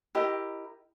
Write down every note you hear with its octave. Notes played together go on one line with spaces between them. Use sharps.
E4 G4 A#4 D#5